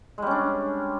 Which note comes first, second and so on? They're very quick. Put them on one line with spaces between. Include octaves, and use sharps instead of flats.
G#3 G3 C#4 D4